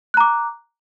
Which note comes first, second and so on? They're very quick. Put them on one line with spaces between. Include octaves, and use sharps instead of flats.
F#6 A#5 D6